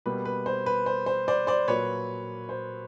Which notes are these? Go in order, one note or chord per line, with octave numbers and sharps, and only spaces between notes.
B2 G3 A#3 B4
B4
C5
B4
C5
C5
C5 D5
C5 D5
A#2 F#3 A#3 B4 C#5
C5